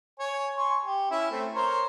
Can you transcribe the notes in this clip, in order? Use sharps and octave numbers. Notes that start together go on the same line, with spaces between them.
C#5 G#5
G#5 C6 C#6
G4
C#4 E4 E5
A3 C4
A#4 C5 C#5